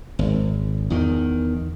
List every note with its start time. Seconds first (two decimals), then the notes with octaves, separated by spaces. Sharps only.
0.19 G#1
0.90 E2 D#3